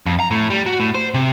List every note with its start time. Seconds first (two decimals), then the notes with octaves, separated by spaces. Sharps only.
0.06 F2
0.20 A#5
0.31 A2
0.50 G3
0.66 F#4
0.80 A2
0.95 C5
1.14 C3